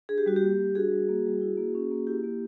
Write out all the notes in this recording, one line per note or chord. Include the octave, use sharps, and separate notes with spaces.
D4 G#4
G4
G3 F#4
G4
A#3
G3
D4 F#4 G#4
G3
A#3
G3
E4
A#3
C#4
A#3
E4 G4
A#3